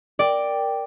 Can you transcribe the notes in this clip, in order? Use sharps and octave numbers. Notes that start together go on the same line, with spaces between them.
A#4 D5 G5